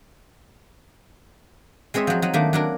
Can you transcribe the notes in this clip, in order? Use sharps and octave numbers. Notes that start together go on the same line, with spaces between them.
G#3 C4 C#5 D#5 E5
F3 F#3
F#3 D#4
D#3 A3 A#3 D4
F#3 D4 A#4